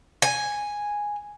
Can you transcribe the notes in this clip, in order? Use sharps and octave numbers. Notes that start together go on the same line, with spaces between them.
G#5